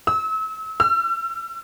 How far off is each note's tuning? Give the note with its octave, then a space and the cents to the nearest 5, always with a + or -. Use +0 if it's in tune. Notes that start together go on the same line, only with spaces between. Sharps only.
E6 -35
E6 +40